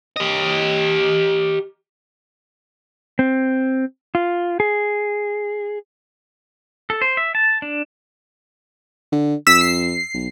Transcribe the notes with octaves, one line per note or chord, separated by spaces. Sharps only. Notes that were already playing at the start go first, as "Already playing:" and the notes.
G4 D#5
C4
F4
G#4
A4
C5
E5
A5
D4
D3
F2 E6 B6
C7
B1